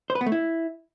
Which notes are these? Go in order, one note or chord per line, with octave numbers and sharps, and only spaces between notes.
C5
B4
B3
A3
E4